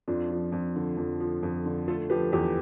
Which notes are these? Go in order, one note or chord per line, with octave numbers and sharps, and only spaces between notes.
F2 D4 F4
F3
F2
D3
F2
F3
F2
D3
A3 F4 A4
F3 G4 B4
E2 G4 B4